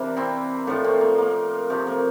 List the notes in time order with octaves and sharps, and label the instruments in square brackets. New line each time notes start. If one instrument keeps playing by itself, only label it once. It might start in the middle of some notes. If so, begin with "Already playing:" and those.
Already playing: [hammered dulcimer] C3 E3 A#3 D4
C4 E4
A2 F3 A#3 D4
A3 C4
A#3
A#3
C3 F3 A3
A#3